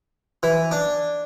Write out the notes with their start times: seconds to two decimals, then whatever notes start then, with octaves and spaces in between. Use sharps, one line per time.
0.43 E3
0.71 D4